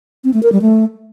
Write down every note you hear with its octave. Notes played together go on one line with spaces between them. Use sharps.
C4
A3
A#4
G3
A3